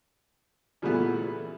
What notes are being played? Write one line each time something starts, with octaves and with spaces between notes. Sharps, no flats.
A#2 C#3 E3 G3 A3 B3